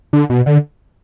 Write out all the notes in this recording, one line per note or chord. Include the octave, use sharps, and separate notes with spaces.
D3
B2
D3